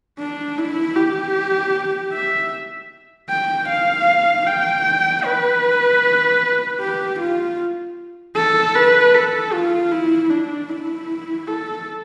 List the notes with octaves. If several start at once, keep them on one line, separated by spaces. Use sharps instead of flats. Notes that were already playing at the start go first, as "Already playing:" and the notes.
D4
E4
G4
E5
G5
F5
G5
B4
G4
F4
A4
B4
A4
F4
E4
D4
E4
A4